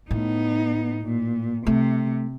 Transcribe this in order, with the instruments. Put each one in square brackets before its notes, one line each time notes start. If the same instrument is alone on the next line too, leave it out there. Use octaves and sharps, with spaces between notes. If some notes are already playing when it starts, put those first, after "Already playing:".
[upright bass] A2 [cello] B3 D#4
[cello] A#2
[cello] C3 [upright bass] A3